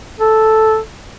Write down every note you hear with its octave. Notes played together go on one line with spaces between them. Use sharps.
A4